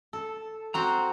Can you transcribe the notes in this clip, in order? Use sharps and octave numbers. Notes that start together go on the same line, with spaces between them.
A4
C4 F#4 C5 A#5